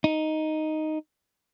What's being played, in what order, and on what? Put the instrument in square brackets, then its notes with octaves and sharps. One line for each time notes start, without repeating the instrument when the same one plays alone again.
[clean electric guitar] D#4